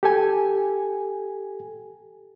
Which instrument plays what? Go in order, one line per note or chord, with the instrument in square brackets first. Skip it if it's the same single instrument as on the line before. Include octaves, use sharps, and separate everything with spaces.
[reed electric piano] G4 A4 G#5